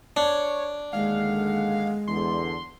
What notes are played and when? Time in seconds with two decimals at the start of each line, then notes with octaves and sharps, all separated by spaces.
0.17 D4 C#5
0.93 D#2 D3 G#3 F5 F#5
2.08 E2 D3 C6